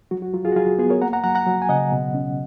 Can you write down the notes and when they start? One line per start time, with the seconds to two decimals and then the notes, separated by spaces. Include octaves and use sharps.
0.11 F#3 F#4
0.22 F#4
0.34 F#3 F4
0.45 F4 G#4
0.52 F#4
0.56 F#3 F4 G#4
0.79 B3 F4 G#4
0.90 A#4 C#5
1.02 A#3 F#5 A#5
1.13 F#5 A#5
1.24 F#3 F#5 A#5
1.35 F#5 A#5
1.46 F#3
1.62 G#5
1.69 C#3 D#5 F#5
1.92 B2
2.14 C#4